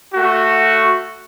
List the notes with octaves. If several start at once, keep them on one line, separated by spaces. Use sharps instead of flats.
A3 F#4